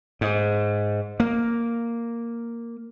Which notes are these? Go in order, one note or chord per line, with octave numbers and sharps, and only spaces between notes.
G#2
A#3